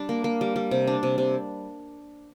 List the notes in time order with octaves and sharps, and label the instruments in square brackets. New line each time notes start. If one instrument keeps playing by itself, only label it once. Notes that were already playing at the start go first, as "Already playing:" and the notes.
Already playing: [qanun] G3 D4
A#3
A#3
G3
G3
C3
D4
C3
C3